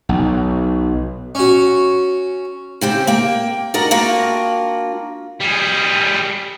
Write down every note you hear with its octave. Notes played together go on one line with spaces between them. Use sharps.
B1
C#4 F#4
C#3 C4 G4
A#3 G5
D4 F#4 A#4 D#5
A#3 D4 F4 F#4 G5
G3 G#4